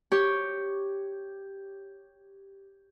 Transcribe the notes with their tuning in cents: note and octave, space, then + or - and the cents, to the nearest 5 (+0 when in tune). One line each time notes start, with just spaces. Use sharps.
G4 +0 C#5 +0